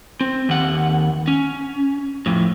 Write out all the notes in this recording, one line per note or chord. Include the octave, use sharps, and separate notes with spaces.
C4
D#2 F#5
C#4
F2 A2